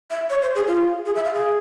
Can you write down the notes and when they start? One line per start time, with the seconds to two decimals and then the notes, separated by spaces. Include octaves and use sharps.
0.10 E5
0.30 C#5
0.42 C5
0.55 G#4
0.67 F4
1.06 G#4
1.15 E5
1.25 F5
1.34 G#4